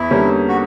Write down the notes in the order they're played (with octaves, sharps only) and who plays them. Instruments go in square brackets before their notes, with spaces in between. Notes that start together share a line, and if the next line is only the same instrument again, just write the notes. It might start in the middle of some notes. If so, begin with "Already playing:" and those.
Already playing: [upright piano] E2 [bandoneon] E4
[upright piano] D3 G3 A#3 C#4
[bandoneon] F#4